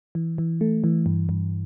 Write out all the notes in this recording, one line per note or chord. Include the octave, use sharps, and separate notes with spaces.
E3
E3
A3
E3
G2
G2